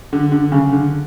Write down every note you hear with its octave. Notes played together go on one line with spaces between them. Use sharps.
D3
D3
C#3
D3